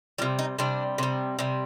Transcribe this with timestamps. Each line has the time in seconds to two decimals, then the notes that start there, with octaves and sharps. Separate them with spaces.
0.18 G3 F4
0.22 C3
0.39 D#4
0.59 C3 G3 D4
0.98 C3 G3
1.39 C3 G3